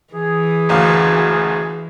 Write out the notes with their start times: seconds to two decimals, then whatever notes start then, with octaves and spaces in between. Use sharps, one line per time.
0.13 E3 G#4
0.69 F#1 D2 F5